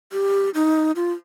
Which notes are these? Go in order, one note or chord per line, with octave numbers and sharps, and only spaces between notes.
G4
D#4
F4